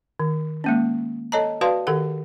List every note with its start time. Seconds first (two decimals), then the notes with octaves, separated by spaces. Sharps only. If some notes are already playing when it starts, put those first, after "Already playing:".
0.20 D#3
0.64 G#3 A#3 C#4
1.32 A4 C#5 D#5 A5 A#5
1.61 F#4 B4 D5 F5 A5 C6
1.87 D#3 G4 A4 F#5